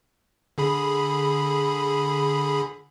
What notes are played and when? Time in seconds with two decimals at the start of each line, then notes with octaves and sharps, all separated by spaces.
0.58 D3 G#4 B5